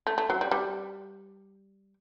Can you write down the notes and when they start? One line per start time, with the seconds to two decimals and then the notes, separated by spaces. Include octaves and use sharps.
0.07 A3
0.18 A3
0.30 F#3
0.41 G3
0.51 G3